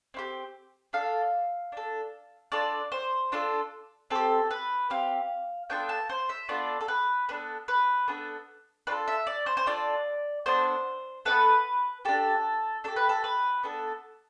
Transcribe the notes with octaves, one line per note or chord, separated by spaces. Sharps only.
C4 E4 G4
D4 A4 F5
D4 A4
D4 F4 A4 D5
C5
D4 F4 A4
C4 G4 A4
B4
C4 G4 F5
B3 D4 F4 A4 G5
A5
C5
E5
B3 D4 F4 A4 D5
A4
B4
B3 D4 A4 B4
B4
B3 D4 A4
D4 F4 A4 B4
E5
D5
C5
C5
D4 F4 A4 D5
B3 D4 A4 C5
B3 D4 A4 B4
D4 G4 A4
D4 G4 A4
B4
A4
B4
B3 D4 A4